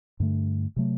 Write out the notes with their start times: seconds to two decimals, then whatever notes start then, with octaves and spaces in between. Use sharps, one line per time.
0.20 G2 D3 A3
0.76 C3 F#3 A3